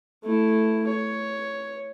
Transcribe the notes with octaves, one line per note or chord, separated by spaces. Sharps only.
A3 E4
C#5